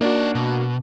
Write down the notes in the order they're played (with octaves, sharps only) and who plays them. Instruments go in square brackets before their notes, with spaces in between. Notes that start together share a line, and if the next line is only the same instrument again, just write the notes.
[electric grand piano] A#3 D4 F#4 [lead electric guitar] D#4 D5
[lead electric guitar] B2